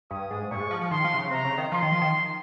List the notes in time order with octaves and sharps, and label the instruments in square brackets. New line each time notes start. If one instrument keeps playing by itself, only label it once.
[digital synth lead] G2 [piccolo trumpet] D#6
[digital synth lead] G#2
[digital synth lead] A#2 [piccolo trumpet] C#6
[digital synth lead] G2
G#2
F3
F3
[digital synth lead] D#3 [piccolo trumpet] C6
[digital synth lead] F3
C3
C#3
[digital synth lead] C3 [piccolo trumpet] A#5
[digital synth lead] C#3
D#3
[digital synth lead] F3 [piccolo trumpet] C6
[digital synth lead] D#3
F3
D#3